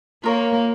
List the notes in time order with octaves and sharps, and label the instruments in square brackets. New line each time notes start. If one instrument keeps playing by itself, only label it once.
[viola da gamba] A#3 [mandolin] F4 A#4 C#5